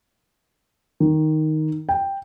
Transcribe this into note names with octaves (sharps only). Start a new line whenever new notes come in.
D#3
G5